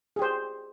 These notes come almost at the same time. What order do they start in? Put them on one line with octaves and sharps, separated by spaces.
G#4 G4 C5